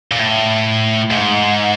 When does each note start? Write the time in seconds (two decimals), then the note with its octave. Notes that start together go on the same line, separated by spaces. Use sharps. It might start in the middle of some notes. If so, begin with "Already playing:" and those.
0.12 A#2
0.19 A2
1.11 G#2